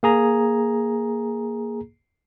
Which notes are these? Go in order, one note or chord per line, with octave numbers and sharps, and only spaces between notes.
A#3 G#4 A#5